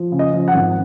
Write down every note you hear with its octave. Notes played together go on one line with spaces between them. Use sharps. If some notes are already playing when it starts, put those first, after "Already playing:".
Already playing: F3
C#3
D#5
F3
F#5
G#1